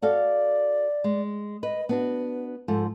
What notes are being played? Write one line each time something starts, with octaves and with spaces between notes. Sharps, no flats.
F#4 A4 D5 F5
G#3
B4 D#5
B3 D4 F#4 B4
G#2 F3 A4